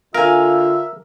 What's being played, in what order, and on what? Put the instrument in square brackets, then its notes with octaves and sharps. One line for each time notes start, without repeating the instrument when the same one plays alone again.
[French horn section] D3 F4 [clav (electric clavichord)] A#4 [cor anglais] E5 [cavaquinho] F5 G#5